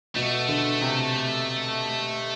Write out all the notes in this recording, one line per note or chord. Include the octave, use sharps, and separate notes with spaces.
B2 A3
D3
C3